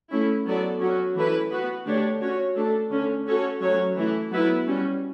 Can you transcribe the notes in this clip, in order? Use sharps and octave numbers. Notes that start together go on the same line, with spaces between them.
A3 C#4 E4
F#3 B3 F#4 A4 D5
F#3 C#4 F#4
E3 A3 E4 B4
B3 F#4 B4
D3 A3 D4 G4 C#5
C#4 F#4 C#5
A3 D4 A4
D3 A3 C#4
C#4 F#4 A4 C#5
F#3 A3 C#4 F#4 C#5
E3 A3 E4
F#3 B3 E4 B4
G3 C#4 F#4